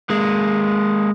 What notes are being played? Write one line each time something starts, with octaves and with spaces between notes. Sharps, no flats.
G#3 A#3